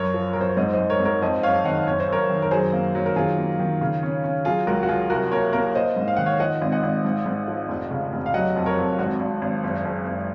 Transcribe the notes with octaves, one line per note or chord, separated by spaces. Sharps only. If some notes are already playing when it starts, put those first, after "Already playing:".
Already playing: F#2 A#4 C#5
F3
F#2 A#4
C5
C#5
G#2 C5 D#5
G#2 C5 D#5
A#4 C#5
G#2
A#4 C#5
F2 C5 D#5
F#1 C#5 F5
D#3 D#5 F#5
F#1 C#5
C5
F#2 A#4 C#5
D#3
A#4
F#3 G#4 C5
A#3
F#3
A#4
D#3 F4 G#4
A#3
D#3
C#3
C#4
C#4
F#3 F4 G#4
C#2 F#4 A#4
F#4
F#3 F4 G#4
C2 F#4 A#4
A#3 A#4 C#5
A#3 A#4 C#5
A#3 C5 D#5
G#2
F5
D#3 F#5
C#5 F5
F3 D#5 F#5
G#1
D#5 F#5
G#1
G#2
G#2
F3
F1
C#3
F1
F5
F#3 D#5 F#5
F2
A#4 C#5
F2
G#1 F#4
G#1
G#1
F#1
F#1
F#1